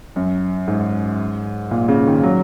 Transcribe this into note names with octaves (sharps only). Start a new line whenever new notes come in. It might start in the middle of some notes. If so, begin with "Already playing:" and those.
F#2
G#2
A#2
C#3
D#3
F#3